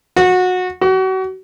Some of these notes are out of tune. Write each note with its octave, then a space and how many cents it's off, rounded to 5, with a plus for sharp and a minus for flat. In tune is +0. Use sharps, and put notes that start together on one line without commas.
F#4 -20
F#4 +35